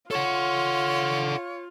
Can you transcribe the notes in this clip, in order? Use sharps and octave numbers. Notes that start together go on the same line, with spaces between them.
F4 A4 C#5 F#5